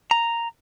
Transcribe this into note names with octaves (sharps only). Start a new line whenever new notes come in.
A#5